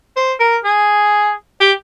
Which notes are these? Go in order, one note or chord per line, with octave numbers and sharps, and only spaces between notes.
C5
A#4
G#4
G4